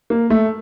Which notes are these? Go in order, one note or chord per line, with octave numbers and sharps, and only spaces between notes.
A#3
A3